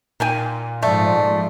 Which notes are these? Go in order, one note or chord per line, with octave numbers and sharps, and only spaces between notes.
A#2 D#3 G5 G#5
G#2 F3 A3 D5